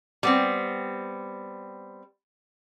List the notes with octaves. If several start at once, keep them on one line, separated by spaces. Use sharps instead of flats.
G3 B3 C4